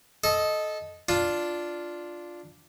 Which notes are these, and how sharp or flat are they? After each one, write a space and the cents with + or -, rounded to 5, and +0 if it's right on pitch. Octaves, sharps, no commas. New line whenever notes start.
A4 -15 D#5 +0
D4 +0 F4 +0